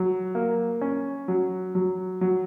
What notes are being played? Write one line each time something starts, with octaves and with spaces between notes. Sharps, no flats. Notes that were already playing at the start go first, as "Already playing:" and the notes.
Already playing: F#3
A#3
C#4
F#3
F#3
F#3